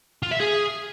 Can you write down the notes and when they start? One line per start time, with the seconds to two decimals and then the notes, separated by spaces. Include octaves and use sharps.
0.23 F4
0.31 E5
0.40 G#4